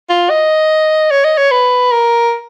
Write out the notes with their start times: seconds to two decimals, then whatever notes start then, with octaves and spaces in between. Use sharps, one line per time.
0.09 F4
0.30 D#5
1.11 C#5
1.24 D#5
1.38 C#5
1.51 B4
1.92 A#4